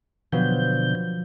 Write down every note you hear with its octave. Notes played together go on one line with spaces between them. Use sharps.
B2 D3 F3 F#3 B3 G6